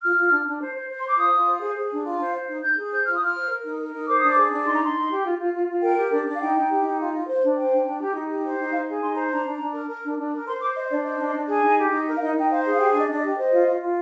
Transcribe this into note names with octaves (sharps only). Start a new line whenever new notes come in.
F4 F6
F4
D4
D4
C5
C5
C5
C6
C5 D6
F4 D#6
F4
C5
G#4
G#4
D4
F4
C5
C5
D#4
D#4 G6
G#4
C5 G6
F4 F6
D#6
F4 F6
C5
A#4
D#4
A#4
D#4
C5 D6
D4 D#6
D6
G#4
D4
D#4 C6
A#5
D#4 C6
D#4
G4
F4
F4
F4
F4
A#4 G5
G4
D4
D4
F5
D#4 G5
D#4
G4
D#4
F4
F4
C5
D4
C5 G5
D4
D4
G4
D#4
G4
C5
D#4
D#4 F5
G#4
D#4 C6
C5 A#5
D4 A#5
D4
D4
A#4
A#4
D4
D4
A#4
C5 C6
C5 D6
C5 D#5
D4 D5
C5 D#5
D4
D4
G#4
D#4
G4
D#4
A#4
F5
D#4 D#5
D#4 G5
C5 F5
G#4
F5
G4 G5
D4 D#5
D4 D5
D#5
G4
C5 D#5
F4
F4
F4